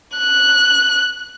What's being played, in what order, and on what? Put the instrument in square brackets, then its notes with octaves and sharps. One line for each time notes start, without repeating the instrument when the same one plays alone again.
[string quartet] F#6